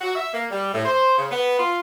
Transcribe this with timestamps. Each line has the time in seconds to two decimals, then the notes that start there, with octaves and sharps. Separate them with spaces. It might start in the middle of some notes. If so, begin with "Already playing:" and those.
0.01 F#4
0.16 E5
0.34 A#3
0.51 G3
0.73 A2
0.85 C5
1.18 C#3
1.30 B3
1.59 F4